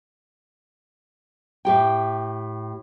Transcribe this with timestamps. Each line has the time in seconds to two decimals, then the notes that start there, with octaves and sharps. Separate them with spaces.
1.65 A2 G4 G5